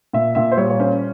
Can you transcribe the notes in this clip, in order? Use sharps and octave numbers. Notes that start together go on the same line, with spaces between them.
A#2 E5
A#2 E5
C5
G3 C#5
C#5
C#4 C5